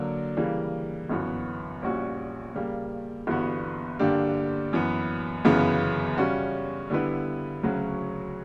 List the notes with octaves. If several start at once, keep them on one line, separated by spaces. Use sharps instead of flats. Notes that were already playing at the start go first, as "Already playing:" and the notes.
Already playing: D3 F#3 A#3 D4 A#4
C#3 E3 G3 A#3
G1 F#2 E3 B3 F#4
A#1 A#2 G3 C#4 F#4
C#3 G3 A#3
G1 G2 E3 B3 F#4
G2 D3 A#3 D4 G4
F#2 E3 B3
G1 F#2 C#3 E3 B3
C#3 G3 C#4 F#4
D3 G3 B3 E4 B4
D2 C#3 F#3 C#4 F#4